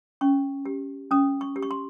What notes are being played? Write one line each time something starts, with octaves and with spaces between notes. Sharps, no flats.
C#4 C#6
G4
C#4 D#6
C#6
G4
C#6
C6